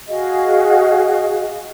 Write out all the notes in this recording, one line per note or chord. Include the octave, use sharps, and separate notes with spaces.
F#4 G#4 D#5 F5